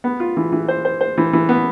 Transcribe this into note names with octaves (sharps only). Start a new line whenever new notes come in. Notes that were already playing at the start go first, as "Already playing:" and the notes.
B3
F4
E3
E3
C5
C5
C5
E3
E3
B3